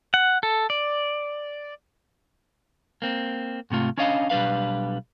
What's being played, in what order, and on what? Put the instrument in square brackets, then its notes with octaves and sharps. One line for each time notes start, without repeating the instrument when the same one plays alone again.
[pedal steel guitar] F#5
A4
D5
[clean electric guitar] A#3 C4
G#2 C3 A3 F4
C#4 D4 C#5 D#5 F5
B1 G3 D4 B4 F5